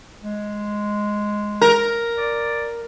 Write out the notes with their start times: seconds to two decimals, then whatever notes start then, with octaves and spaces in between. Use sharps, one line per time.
0.22 G#3
1.61 A#4
2.17 D5